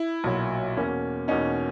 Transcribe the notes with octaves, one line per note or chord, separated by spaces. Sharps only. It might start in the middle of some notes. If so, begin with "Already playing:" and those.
Already playing: E4
B1 A#2 F#3
E2 B2 A#3 C#4
E2 B2 A#3 C#4 D#4